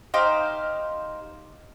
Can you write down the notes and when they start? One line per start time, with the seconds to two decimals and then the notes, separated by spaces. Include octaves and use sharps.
0.14 D#4 G4 C5 F5